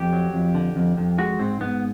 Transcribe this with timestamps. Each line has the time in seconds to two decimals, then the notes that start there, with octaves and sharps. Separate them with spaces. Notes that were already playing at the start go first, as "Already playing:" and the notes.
Already playing: F2 G4
0.13 F#3
0.34 F2
0.55 D3
0.76 F2
0.97 F2
1.18 G#3 F#4
1.39 G#2 C4
1.61 G#2 B3